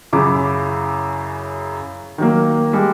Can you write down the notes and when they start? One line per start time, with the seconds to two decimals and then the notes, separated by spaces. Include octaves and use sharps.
0.13 F#2 C#3 E4 D6
2.18 D#3 F#3 A#3
2.73 G3 G#3